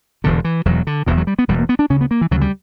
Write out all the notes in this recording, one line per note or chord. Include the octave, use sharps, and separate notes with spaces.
E1 E2 B2 D3
E3
E1 E2 B2 F#3
D3
E1 E2 B2 E3
F#3
G3
B3
E1 E2 B2 G3
A#3
B3
D4
D2 C#3 C#4
B3
A#3
E3
D2 C#3 F#3
G3